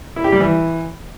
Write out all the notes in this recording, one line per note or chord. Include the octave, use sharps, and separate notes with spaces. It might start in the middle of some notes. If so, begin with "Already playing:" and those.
E4
G4
G3
E3